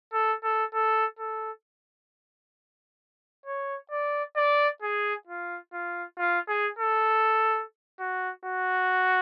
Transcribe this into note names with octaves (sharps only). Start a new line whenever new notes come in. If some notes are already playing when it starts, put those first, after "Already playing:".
A4
A4
A4
A4
C#5
D5
D5
G#4
F4
F4
F4
G#4
A4
F#4
F#4